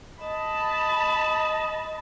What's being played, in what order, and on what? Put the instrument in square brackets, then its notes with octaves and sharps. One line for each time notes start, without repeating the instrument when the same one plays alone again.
[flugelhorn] D#5 [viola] A5 B5